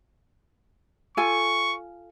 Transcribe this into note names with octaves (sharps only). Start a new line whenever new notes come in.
F4 A4 G#5 C#6